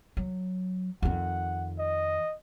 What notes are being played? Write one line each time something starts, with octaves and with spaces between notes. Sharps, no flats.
F#3
F2 D#3 F#5
D#5